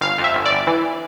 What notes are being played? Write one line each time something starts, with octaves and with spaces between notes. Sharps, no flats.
G1 F5
F2
E5
G1
D5
G1
E3